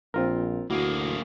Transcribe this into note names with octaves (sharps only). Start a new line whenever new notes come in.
A#1 C4 F4 A#4
D2 A#3 E4 F#4 G#4